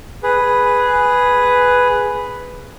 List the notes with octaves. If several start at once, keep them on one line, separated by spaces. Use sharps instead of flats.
G#4 B4